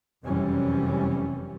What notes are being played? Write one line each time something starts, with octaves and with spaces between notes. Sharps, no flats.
F1 F#2 C3 E3 G3 C#4